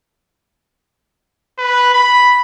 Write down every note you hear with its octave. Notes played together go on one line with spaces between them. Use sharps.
B4
B5